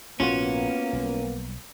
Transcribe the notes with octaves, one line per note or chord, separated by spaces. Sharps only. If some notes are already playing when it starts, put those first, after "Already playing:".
A#1 G#2 C3 A#3 B3 C#4 F4 F#4
B1 G3